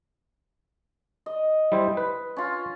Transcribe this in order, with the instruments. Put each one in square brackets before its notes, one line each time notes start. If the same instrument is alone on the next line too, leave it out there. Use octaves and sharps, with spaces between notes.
[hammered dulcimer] D#5
[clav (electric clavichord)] G3 E4 C5
B4
[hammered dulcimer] C#4 F4